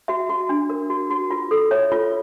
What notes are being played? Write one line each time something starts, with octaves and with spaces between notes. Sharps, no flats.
F#4 E5
F#4
D4
A#4
F#4
F#4
F4
A4
C#5 E5
F4